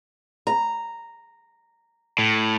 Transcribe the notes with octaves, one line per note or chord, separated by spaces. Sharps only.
A#5
A2